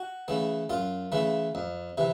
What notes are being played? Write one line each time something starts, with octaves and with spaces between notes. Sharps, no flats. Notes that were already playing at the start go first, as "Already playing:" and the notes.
Already playing: F#4
C#3 E3 A3
F#2 F4
C#3 E3 A3
F2
C3 E3